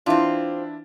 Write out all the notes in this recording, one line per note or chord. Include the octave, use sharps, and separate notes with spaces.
E3 C4 D4 E4 F4